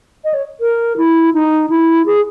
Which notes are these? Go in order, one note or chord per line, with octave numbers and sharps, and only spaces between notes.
D#5
C#5
A#4
E4
D#4
E4
G#4